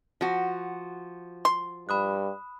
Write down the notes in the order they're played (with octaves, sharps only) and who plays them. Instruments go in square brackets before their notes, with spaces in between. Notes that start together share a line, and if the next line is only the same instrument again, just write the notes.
[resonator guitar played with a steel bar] F3 F#4
[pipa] C6
[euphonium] G2 [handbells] B5 D#6 F#6